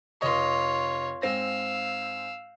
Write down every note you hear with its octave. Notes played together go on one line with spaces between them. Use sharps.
F1 F4 C#5 D#5 C#6
G#2 C4 F5 E6 A#6